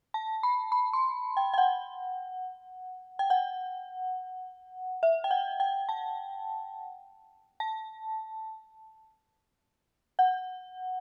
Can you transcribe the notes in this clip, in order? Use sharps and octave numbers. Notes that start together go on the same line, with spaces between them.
A5
B5
B5
C6
G5
G5
F#5
G5
F#5
E5
G5
F#5
G5
A5
A5
F#5